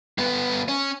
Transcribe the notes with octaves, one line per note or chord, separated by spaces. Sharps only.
G2 B3
C#4